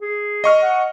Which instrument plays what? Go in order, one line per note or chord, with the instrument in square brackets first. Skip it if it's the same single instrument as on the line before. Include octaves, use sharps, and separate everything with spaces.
[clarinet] G#4
[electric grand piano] D#5 C#6 F6
[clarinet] F#5